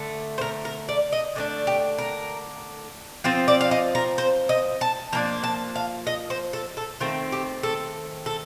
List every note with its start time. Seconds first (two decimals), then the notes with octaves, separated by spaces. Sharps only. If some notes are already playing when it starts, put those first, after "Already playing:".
Already playing: D3 A3
0.38 C5
0.41 A#4
0.65 A#4
0.89 D5
1.13 D#5
1.35 D3 A3 D4 D5
1.67 G4
1.98 A#4
3.24 F3 C4 F4
3.48 D5
3.61 F5
3.71 D#5
3.95 A#4
4.18 C5
4.49 D#5
4.81 A5
5.13 F3 A#3 D4 A#5
5.44 A5
5.76 F5
6.07 D#5
6.30 C5
6.53 A4
6.77 A4
7.00 D#3 A3 C4 F4
7.32 G4
7.63 A4
8.26 A4